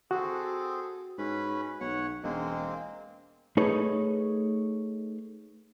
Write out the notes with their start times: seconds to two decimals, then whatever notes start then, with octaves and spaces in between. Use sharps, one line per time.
0.11 C4 F#4 G#4 A4
1.18 G#2 C#4 B4 B5
1.81 B1 C#5 F#5
2.23 E1 G#3 A#3 C4
3.57 A3 D#4 G#4 B4 C#5